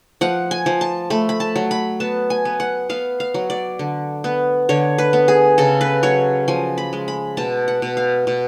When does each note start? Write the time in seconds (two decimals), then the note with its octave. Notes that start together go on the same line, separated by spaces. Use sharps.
0.21 F3 F#5
0.51 G#5
0.66 F3
0.81 A5
1.10 A3 B5
1.29 B5
1.40 A5
1.56 F#3
1.71 B5
2.00 B3 A5
2.30 G#5
2.45 B3
2.60 F#5
2.89 B3 F5
3.20 F5
3.34 F#3
3.50 D5
3.79 D3
4.24 B3
4.69 D3 C#5
4.98 B4
5.13 B3
5.28 G#4
5.58 C#3 A4
5.81 B4
6.03 F#3 C#5
6.48 F3 G#5
6.78 B5
6.93 G#3
7.08 B5
7.37 B2 A5
7.68 F#5
7.82 B2
7.97 F5
8.27 B2